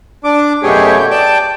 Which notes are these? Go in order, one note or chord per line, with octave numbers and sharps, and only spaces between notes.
D4 D6
F#2 B2 A3 G4 G#4 C#5
G5
D5 G5 A5